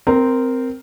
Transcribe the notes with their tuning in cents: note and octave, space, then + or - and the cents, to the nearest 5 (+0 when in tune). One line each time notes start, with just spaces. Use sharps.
C4 -10 A#4 +0